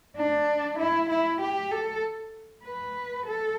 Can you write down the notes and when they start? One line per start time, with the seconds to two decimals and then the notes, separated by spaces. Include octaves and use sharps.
0.17 D4
0.78 E4
1.10 E4
1.41 G4
1.71 A4
2.64 B4
3.27 A4